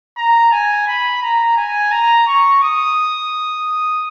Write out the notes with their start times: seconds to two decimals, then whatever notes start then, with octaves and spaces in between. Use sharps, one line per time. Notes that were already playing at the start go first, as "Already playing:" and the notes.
0.17 A#5
0.52 G#5
0.87 B5
1.22 A#5
1.57 G#5
1.91 A#5
2.27 C#6
2.62 D#6